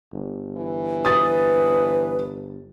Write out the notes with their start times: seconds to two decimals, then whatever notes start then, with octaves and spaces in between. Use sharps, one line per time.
0.13 G1
0.57 E3
1.05 B4 D#6 A6